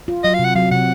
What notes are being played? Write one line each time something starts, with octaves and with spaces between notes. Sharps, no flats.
F4
F#3 D#5
F5
C3
F#5
F#3 F5
C3 F#5